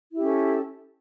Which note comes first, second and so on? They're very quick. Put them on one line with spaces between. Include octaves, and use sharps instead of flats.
E4 G4 C#4 A4